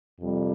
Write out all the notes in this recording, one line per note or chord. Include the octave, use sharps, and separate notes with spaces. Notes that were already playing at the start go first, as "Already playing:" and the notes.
F2 C3 G3